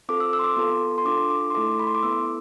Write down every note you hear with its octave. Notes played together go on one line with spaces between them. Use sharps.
C4 F4 A4 D6
E6
E6
C6
D6
B3 F4 A4 C6
C6
D4 F4 A4 D6
D6
C6
A3 E4 A4 D6
B5
C6
D6
B3 E4 A4 E6